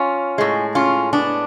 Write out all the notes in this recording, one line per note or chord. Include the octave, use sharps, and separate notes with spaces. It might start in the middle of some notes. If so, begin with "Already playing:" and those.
Already playing: C#4 F4
A2 G#3
C#4 F4
B3 D4